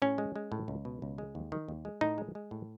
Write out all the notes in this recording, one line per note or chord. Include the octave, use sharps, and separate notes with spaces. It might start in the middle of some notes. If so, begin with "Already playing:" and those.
A2 C#4
G#3
G#3
A2
C#2
B2
C#2
G#3
D#2
D#3
D#2
G#3
A2 D#4
G#3
G#3
A2